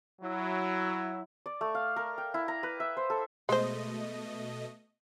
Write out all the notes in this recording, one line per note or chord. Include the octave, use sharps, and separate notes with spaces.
F#3 E4
D5
A3
F5
A#4
G5
E4
A#5
B4
E5
C5
A4
B2 G#3 A3 C5 D#5